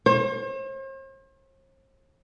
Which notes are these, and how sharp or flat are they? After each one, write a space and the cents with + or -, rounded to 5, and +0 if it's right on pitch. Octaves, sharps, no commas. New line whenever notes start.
C5 +45